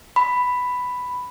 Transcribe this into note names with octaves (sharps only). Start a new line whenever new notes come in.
B5